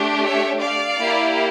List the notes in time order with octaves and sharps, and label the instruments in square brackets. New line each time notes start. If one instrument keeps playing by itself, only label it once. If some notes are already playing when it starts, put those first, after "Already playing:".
Already playing: [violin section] A3 D4 G4
C#5 E5
D5 F5
A#3 E4 G4